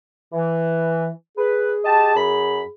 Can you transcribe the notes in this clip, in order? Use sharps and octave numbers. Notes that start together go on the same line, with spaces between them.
E3
G#4 B4
G4 D#5 A5
F#2 B5